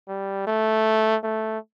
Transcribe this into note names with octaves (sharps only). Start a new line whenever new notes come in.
G3
A3
A3